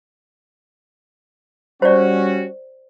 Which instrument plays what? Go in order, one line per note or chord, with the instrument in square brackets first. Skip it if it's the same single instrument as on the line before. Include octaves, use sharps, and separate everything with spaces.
[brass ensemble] G3 C#4 F#4 [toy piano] C5 D5